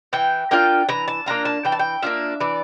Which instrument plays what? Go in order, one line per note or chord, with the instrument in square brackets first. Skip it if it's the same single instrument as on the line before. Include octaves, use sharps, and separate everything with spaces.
[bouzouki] E3 G5
A#3 D4 F4 G5
E3 A#5
A5
A#3 D4 F4 A#5
A5
E3 G5
A5
G5
A#3 D4 F4 E5
E3 D5